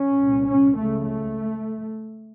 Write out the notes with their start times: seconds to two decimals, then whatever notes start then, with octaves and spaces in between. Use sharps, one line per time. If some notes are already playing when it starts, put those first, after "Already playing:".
Already playing: C#4
0.19 C2 A#2
0.48 C#4
0.76 C#2 C#3 A3
1.05 A3